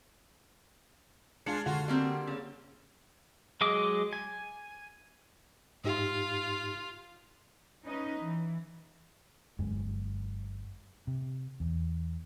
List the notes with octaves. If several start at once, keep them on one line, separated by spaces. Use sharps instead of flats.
G#3 D4 F4 G#6 C#7
D3 F4 F#4
G3 A#3 C4
C#3
F#3 G#3 G#4 D#5 D6
G#5
G#2 D#4 F4 G4
C#4 D#4 B4 D#5
E3
G1 F#2 G#3
C3
E2